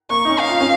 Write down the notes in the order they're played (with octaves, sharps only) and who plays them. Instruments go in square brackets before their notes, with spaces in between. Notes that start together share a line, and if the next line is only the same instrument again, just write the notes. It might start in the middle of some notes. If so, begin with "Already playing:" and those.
[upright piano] A#3 [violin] C#6
[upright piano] D#4
C#4
[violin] F5
[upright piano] F4
C#4